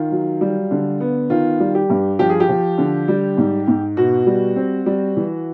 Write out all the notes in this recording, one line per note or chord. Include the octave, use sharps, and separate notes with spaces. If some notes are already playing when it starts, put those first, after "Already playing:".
Already playing: D#3 F4
F#3
G3
D3
B3
D#3 F4
G3
G4
G2
F3 G4
G#4
G4
F3
D3
G3
G#2
G#2
B2 F#4
G3
C4
G3
E3